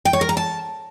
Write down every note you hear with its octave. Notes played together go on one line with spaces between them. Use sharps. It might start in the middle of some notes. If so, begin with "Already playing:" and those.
G5
C#5
A#4
A#5
A5